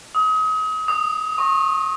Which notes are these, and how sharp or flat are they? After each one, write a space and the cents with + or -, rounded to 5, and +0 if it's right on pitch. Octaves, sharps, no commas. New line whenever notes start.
D#6 +35
D#6 -15
C#6 -35